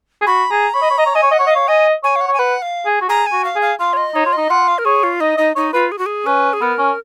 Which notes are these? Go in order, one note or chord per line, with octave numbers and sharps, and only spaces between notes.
G#4
F#4 B5
G#4 A#5
C#5 B5
D#5
C#5
D#5 A#5
C#5
D#5 G#5
C#5
D#5 F#5
C#5
D#5
C#5 F5
D#5 G#5
C#5 G#5
F5
F#5
C#5
G#5
B4 F#5
F5
G#4
F#4
G#4 A#5
G#5
F#4
F5
G#4
F5
F4 F5
C#5
D#5
D#4 C#5
F4
D#4 D#5
F4 F#5
F5
A#4
G#4 C#5
F4
D#4 D#5
D#4 D#5
D#4 C#5
F4 B4
G#4
F#4
G#4
C#4 B4
G#4
B3 A#4
C#4